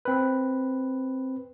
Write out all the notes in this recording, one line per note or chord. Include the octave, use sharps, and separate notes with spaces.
C4 B4